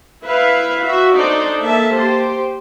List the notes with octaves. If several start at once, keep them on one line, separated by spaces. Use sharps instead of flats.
E4 B4 E5 F5
F#4 E5
D4 D#4 A4 C5 D5
A#3 A4 E5 A5
G4 C5